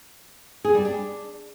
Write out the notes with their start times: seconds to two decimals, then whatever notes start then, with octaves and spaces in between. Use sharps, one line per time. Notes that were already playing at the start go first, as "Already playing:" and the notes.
0.65 G#4
0.75 G3
0.85 D4